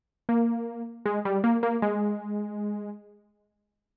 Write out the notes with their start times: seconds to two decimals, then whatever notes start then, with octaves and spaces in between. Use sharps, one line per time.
0.29 A#3
1.06 G#3
1.25 G3
1.44 A#3
1.63 A#3
1.82 G#3